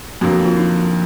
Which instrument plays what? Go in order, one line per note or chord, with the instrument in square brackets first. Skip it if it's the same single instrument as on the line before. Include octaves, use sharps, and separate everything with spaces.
[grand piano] F2 D3 F#3 A#3 [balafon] F#4
[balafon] F#4
F4
D#4